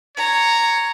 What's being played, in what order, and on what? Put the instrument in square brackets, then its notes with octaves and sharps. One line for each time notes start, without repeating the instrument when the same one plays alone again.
[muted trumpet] C#5 [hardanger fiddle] A#5